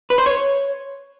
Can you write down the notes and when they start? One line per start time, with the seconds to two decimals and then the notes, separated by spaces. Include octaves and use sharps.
0.10 B4
0.18 C5
0.26 C#5